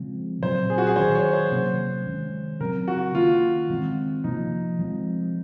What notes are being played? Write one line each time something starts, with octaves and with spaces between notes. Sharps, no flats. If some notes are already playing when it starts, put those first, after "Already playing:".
Already playing: C#3 F3 G#3 C4
A#2 F#3 C4 C5
G#4
F#4
G#4
D#3 F#3 C#4 C5
C#5
C5
C3 F#3 A#3 C#4
D#3 G#3 C#4
C#3 F#3 C4 A#4
F#4
D#3 A#3 C#4 F4
D#3 G#3 C4
C3 F3 A#3 D#4
F3 G#3 C4